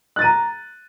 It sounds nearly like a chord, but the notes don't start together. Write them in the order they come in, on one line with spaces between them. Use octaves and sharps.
F#6 A6 D#7 A#5